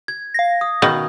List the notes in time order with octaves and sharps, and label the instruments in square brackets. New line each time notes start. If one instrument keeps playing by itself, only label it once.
[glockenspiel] G#6
[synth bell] F5 A#6
[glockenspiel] D#6
[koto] B2 D#3